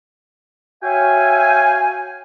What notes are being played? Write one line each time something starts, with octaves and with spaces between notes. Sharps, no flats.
F#4 C#5 E5 F5 G5 G#5